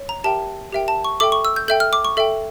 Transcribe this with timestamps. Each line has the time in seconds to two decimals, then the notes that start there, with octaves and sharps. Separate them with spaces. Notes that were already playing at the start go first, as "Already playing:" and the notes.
Already playing: C#5
0.09 A#5
0.24 G4 A#4 E5 G5 A5
0.72 G4 A#4 E5 G5
0.88 A5
1.05 C#6
1.20 A4 E5 G5 D6
1.32 C#6
1.45 E6
1.56 G6
1.68 A4 E5 G5 G6
1.80 F6
1.93 D6
2.05 C#6
2.17 A4 E5 G5